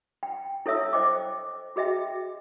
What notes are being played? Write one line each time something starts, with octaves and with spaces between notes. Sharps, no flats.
G5
E4 A4 C#5 E5 D#6 E6
C5 D#5 G5 D6
F#4 G#4 D#5 E5 G5